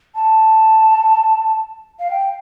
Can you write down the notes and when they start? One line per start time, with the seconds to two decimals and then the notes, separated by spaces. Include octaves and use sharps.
0.15 A5
1.99 F5
2.10 G5